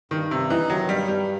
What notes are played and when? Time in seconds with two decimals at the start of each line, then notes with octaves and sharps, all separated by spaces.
0.11 G2 D#3
0.31 G2 C3
0.50 E3 D#4
0.70 D#3 F#3
0.89 G2 G3
1.08 G2 G3